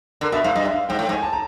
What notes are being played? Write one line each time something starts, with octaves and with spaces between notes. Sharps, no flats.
D3 A#4
B2 E5
G#2 F5
G2 D#5
E5
F5
G#2 G5
A2
G#2
G#5
A5
A#5